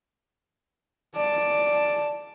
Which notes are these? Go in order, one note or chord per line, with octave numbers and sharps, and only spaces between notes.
D5 A5